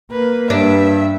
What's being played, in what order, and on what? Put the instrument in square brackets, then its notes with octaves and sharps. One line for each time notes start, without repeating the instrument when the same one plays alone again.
[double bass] A#3 [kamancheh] B4
[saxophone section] G2 [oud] D4 [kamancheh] E5